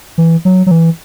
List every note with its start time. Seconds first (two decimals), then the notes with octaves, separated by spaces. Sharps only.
0.18 E3
0.45 F#3
0.66 F#3
0.71 E3